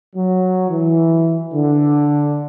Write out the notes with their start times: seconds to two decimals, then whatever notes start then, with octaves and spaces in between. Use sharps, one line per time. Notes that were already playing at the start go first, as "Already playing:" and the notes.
0.16 F#3
0.69 E3
1.54 D3